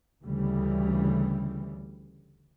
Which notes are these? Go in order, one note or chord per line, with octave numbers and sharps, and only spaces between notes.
D2 C#3 E3 G3